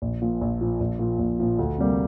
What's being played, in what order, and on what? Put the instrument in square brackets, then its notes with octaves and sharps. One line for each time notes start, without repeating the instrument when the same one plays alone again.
[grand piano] A#1
A#2 F3
A#1
A#2 F3
A#1
A#2 F3
A#1
A#2 F3
D2
C3 G3 A#3